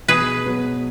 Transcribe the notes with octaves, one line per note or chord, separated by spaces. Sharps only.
B2 G#4 B4
F#3 B3